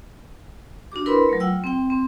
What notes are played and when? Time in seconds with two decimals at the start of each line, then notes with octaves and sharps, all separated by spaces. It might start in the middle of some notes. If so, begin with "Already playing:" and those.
0.92 D4 F#4 G4 D6
1.06 E4 A#4 B4 B5 C6
1.29 F#3 A3
1.40 F4 F#5 G5 E6
1.64 C4 G5
1.90 C4